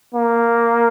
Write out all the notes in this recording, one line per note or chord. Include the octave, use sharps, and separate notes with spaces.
A#3